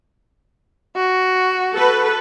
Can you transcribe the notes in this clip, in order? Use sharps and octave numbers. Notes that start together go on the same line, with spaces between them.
F#4
A4 B4